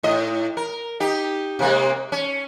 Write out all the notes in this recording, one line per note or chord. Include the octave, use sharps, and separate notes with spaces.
A2 D#5
A#4
D#4 G4
C3 G#3 A#3
C#4